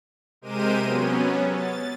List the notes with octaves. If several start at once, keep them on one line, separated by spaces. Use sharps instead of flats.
C3 G#3 G4 A#4 C5 D#7
F#3 B3 C#4
A6